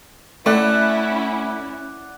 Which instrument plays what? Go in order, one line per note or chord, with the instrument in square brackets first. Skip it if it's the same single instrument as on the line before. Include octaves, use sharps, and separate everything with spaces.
[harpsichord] A3 [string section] C#4 E4 [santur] D5 F#5